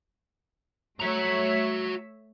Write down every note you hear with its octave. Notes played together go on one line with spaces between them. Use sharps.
A3 F#4 C#5 E5 A#5